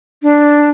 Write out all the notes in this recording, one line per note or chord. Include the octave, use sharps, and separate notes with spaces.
D4